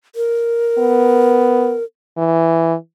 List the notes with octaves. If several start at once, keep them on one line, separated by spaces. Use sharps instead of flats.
A#4
B3
E3